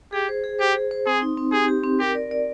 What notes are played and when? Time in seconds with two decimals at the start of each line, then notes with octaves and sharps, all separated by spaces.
0.13 G4 G#4
0.29 C5
0.44 G#4
0.59 G4 C5
0.76 G#4
0.91 C5
1.06 C4 G#4
1.22 D#4
1.37 C4
1.52 G4 G#4
1.68 G4
1.84 C4
1.99 G4 A#4
2.15 D5
2.31 D5